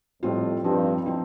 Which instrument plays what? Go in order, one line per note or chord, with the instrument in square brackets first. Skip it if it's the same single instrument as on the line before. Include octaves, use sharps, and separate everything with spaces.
[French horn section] F2 [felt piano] A2 G3 C4 F4
[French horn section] G2 [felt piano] F3 C4 D#4
[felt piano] F3 C4 D#4